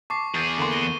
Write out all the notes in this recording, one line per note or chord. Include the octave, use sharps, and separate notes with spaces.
A5 C#6 D6 C7
E2 G#4 G6 A6
D3 A#3 C6
A#6 D#7 G7